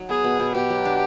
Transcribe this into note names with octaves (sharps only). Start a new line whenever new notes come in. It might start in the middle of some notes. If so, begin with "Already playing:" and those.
Already playing: F#3 D#4
B3 G#4
B2
B2
B2 G4
F#3
D4